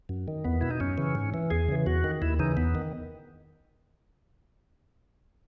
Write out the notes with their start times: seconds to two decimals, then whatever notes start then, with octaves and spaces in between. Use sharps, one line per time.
0.09 F#2
0.28 D#3
0.44 E2 B3
0.61 B2 E4
0.71 D#4
0.80 F#2 C#4
0.98 C#3 E3
1.15 G#2
1.34 E3
1.50 E2 G#4
1.68 C#3 E3
1.86 E2 F#4
2.04 D#3
2.22 D#2 E4
2.39 C#3 E3 D#4
2.57 E2 B3
2.75 D#3